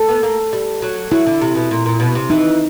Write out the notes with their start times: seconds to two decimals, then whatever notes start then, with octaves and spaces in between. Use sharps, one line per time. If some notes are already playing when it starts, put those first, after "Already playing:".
Already playing: A4
0.09 B3
0.23 A#3
0.53 G3
0.82 F#3
1.11 F#3 E4
1.26 D3
1.41 C3
1.55 B2
1.71 A#2
1.86 A#2
2.00 B2
2.15 C3
2.30 E3 D#4